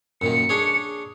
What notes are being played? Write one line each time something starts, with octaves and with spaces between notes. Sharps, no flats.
F#2 A#2 D#3 C#7
D4 G#4 C#5